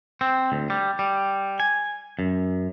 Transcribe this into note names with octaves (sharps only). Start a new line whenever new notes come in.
C4
D2
G3
G3
G#5
F#2